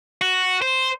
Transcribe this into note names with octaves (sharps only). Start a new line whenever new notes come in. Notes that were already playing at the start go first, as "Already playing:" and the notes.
F#4
C5